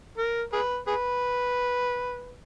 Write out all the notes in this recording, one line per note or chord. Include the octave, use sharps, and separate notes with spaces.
A#4
G#4 B4
G#4 B4